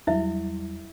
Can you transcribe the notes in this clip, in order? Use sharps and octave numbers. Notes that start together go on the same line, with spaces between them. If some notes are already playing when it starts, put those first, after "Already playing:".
E2 F#3 G3 E4 E5